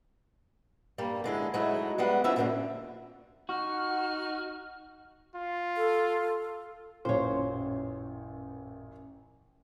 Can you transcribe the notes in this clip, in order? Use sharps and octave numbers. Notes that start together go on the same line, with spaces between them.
G2 G3 A#3
D3 G#3 E4
F#3 G#3 A3 D#4 E4 F#4
G3 G#3 B3 F#5
F3 C#4 D4 E4 F#4 E5
F#2 A#2 D3 D#3 F3 G3
D#4 F#4 F#5 F6
F4
A4
A1 F#2 A#2 C5 C#5